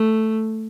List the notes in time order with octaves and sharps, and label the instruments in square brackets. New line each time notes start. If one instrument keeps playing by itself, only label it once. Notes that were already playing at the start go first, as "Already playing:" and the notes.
Already playing: [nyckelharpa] A3